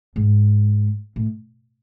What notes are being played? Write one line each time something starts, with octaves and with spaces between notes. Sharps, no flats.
G#2
A2